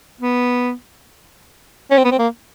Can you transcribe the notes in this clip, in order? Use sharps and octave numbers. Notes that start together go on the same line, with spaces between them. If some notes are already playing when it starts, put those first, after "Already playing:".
B3
C#4
C4
B3
C4
A#3